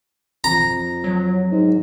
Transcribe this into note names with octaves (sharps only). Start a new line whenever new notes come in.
F2 A#5
F#3
G#2